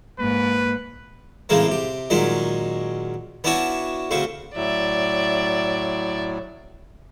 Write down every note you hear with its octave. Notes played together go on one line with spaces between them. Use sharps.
G#2 A#3 B4
A2 C#3 E3 G#3 A#3 C4
C3 G4
A#2 D#3 F#3 G#3 C#4
B3 C#4 D4 E4 F#4 C#5
D2 C#3 C4 C#6
A2 F#3 D5 E5